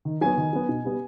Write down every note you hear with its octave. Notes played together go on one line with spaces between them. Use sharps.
D#3
F#3 B3 G#5
D#3
F#3 B3
B2
G3 B3